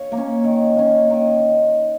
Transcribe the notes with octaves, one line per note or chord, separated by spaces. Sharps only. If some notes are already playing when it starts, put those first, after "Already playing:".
Already playing: C#5 F5
A#3
C#4
D#3
A#3 C#4
D#3